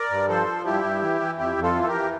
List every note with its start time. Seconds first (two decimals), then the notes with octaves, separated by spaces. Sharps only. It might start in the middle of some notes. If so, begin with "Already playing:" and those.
Already playing: A#4 D5
0.11 G2
0.29 F3 A4 C5
0.47 F3
0.66 G2 E4 G4
0.84 G2
1.02 E3
1.21 E3
1.38 F2 E4 G4
1.57 F2
1.63 F4 A4
1.75 E3
1.83 A4
1.87 G4 A#4
1.93 E3